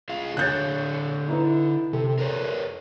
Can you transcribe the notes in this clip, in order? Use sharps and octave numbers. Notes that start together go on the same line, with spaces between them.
F4 G#4 F5
D3 C#5 F#6 G6 A6
D#4 E4 B4
C3 A4
A#4 B4 C#5